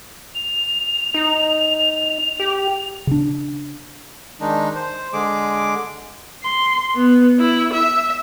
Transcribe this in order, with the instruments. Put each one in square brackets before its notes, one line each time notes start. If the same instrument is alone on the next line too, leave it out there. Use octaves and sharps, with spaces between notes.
[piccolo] F7
[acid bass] D#4
G4
[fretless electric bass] C#3 D4
[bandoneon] D#3 G#3 D4 D#4
C5
D3 G#3 G#4 D6
[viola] C6
B3
E4
E5